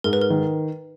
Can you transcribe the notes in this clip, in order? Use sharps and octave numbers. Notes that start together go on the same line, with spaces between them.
G#2 A#4
B4
A#4
D#3